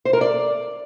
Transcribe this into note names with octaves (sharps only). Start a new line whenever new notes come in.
C5
A#4
D5